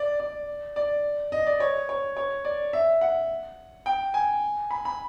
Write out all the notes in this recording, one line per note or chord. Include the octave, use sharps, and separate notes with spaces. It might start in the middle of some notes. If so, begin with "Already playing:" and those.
Already playing: D5
D5
D5
D#5
D5
C#5
C#5
C#5
D5
E5
F#5
G5
G#5
B5
B5